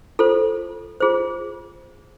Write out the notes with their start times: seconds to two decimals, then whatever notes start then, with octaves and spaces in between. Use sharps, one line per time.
0.19 F4 A4 C5
1.00 F4 G#4 C5